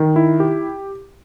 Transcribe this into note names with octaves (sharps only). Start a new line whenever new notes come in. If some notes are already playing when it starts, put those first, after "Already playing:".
Already playing: D#3
E4
G4